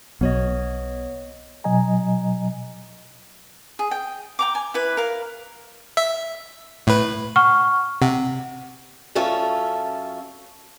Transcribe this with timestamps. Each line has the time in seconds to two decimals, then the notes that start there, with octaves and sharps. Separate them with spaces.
0.21 B1 B2 B3 C#5 D#5
1.64 B2 F#3 D#5 G#5 A#5
3.79 G#4
3.91 G5
4.39 G5 A#5 D6
4.55 G#5
4.74 E4 B4
4.97 A#4 F5
5.97 E5
6.87 A2 B4
7.36 F#5 C#6 F6
8.02 C3 F#5
9.15 F#2 C#4 F4 A4 E5